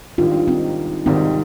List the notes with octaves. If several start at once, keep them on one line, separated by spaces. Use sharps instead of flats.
G#1 G#2 D#3 G3 D4 F4
C4 D#4
G#1 G#2 D#3 G3 C4 D#4